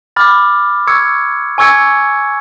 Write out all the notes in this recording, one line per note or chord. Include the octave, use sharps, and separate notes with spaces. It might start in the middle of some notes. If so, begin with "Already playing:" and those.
B5 D6 F6 A6
C#6 E6 G#6 C#7
G#5 C#6 E6 G#6 C#7